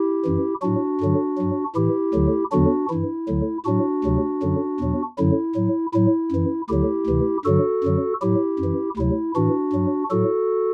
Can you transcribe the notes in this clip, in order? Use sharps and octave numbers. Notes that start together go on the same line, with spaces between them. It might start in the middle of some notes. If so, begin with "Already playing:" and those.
Already playing: E4 G4
F#2 E3
A2 F#3 D4 F#4
G2 D3 F#3
G2 F#3
A2 E3 E4 G4
D2 D3 F#3
E2 D3 F#3 D4 F#4
G2 E3 E4
D2 D3 F#3
A2 F#3 D4 F#4
D2 C3 F#3
F#2 D3 F#3
E2 B2 F#3
F#2 D3 F#3 E4
A2 F#3
A2 F#3 E4
F#2 E3
D2 D3 F#3 E4 G4
D2 C3 E3
G2 D3 F#3 F#4 A4
F#2 D3 F#3
A2 F#3 E4 G4
F#2 E3
D2 C3 F#3 E4
A2 E3 D4 F#4
G2 F#3
A2 F#3 F#4 A4